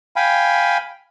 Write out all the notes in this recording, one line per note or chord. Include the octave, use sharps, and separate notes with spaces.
F5 G5 G#5 B5